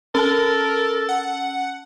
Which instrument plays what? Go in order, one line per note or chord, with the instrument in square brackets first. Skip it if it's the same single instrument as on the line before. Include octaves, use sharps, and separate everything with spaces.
[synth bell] C#4 A5 [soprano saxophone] A4 [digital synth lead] A#4
[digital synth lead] F#5